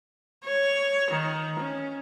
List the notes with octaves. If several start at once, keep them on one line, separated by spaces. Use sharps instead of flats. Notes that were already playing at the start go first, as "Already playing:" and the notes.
C#5
D#3
C#4